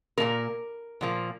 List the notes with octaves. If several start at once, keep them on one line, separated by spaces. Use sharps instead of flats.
A#2 F3 A#3 A#4
A#2 F3 A#3